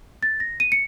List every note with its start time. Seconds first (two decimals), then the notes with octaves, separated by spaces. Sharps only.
0.23 A6
0.40 A#6
0.60 D#7
0.72 C#7